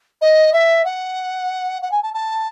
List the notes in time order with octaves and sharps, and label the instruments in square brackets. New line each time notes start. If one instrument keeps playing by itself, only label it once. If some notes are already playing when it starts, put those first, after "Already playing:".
[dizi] D#5
E5
F#5
F#5
G#5
A5
A5